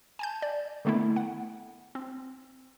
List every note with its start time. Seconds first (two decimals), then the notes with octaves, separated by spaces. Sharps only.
0.19 G#5 A5 G6
0.42 D5
0.85 D3 D#3 A3 B3 E4
1.16 F#5
1.95 C4